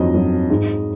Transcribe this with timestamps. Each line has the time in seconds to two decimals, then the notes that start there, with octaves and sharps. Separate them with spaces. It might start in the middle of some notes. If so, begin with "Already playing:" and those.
Already playing: F2 D#3 F#3 D#5
0.15 F#3
0.50 G#2